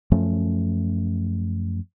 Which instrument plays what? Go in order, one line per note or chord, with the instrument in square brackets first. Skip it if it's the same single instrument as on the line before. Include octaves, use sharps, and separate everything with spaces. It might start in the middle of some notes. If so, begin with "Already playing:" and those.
[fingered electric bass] F#2 F3 A3 C#4